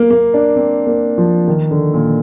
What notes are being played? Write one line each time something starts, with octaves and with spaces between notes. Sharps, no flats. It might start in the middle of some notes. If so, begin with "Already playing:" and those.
Already playing: A#3
A#3
D4
C4
A#3
F3
D#3
D3
A#2